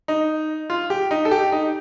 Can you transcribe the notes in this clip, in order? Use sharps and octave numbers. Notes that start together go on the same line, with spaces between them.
D#4
F4
G4
D#4
A4
G4
D#4